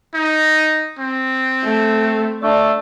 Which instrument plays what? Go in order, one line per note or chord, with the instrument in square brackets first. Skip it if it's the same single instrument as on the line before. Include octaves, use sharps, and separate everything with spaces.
[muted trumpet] D#4
C4
[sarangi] A3
[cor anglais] A3 [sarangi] D4